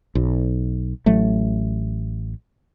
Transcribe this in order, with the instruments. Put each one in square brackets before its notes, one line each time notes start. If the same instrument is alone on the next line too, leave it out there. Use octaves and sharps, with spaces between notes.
[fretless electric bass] B1
A1 F#3 A3